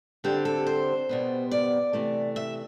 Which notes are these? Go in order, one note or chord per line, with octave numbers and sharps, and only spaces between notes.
D3 G3 C4 G4
A4
C5
B2 G3 B3
D5
C3 E3 A3
E5